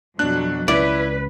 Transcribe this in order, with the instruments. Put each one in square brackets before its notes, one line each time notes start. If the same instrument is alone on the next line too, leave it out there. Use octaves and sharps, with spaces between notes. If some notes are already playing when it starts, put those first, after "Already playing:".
[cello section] F2 B2 F#3 [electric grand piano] D4 F#6
[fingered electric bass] C#2 C#4 [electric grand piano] E4 [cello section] B4 [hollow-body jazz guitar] D5